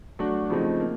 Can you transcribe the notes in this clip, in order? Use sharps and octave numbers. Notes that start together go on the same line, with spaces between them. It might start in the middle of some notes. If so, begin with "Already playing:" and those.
F#3 A3 D4 F#4
C#3 F3 A3 C4 D#4
A#3